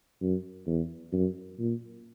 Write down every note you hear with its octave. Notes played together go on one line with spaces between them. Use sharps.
F#2
E2
F#2
A#2